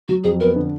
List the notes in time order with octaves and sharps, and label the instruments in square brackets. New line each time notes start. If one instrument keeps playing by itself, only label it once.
[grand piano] F#3 [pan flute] F#4
[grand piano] F2 [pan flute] G#4
[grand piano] B3 [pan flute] A#4
[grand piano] D3